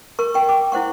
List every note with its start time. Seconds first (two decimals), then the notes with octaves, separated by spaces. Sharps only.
0.19 A#4 C#6
0.34 G5 C#6
0.49 D6
0.72 E4 C5 F#5 C#6